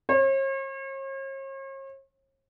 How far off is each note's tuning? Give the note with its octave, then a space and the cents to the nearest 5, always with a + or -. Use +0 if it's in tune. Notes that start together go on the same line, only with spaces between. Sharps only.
C#5 -45